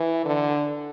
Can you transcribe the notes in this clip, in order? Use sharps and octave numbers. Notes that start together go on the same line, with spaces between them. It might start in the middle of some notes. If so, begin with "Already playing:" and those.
Already playing: E3
D3